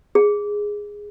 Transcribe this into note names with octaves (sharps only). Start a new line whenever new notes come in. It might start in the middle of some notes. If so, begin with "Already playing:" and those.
G#4